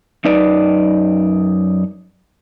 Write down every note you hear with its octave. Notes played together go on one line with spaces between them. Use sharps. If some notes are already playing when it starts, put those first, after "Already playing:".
F#2 D#4 B4 D5